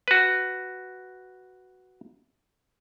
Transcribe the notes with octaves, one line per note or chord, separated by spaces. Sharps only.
F#4 B4